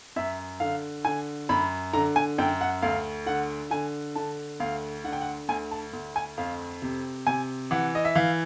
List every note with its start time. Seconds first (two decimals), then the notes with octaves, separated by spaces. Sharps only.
0.16 F#2 E5
0.60 D3 F5
1.05 D3 G#5
1.49 F#2 B5
1.93 D3 A#5
2.16 G#5
2.38 F#2 G5
2.61 F#5
2.82 D2 F5
3.26 D3 F#5
3.71 D3 G#5
4.16 D3 A5
4.60 D2 F5
5.04 D3 F#5
5.13 G5
5.21 F#5
5.49 D2 G#5
5.71 A5
5.93 D2
6.16 G#5
6.38 F2 F5
6.82 C3
7.27 C3 G#5
7.71 E3 F#5
7.95 D#5
8.05 E5
8.15 E3 F5